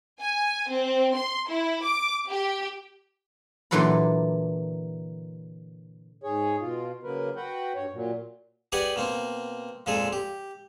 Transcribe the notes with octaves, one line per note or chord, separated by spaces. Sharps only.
G#5
C4
C6
E4
D6
G4
A#2 D3 E3 F#3 A4 B5
G#2 G#4 C#5
B2 F4
C#3 F#3 A#3 A#4 B4
F#4 B4 F#5 G5
G2 C#5
A#2 F#3
G4 G#4 B4 D5 F#5 G#5
B2 A#3 C4
F2 A#2 G#3 G#4 A4
G4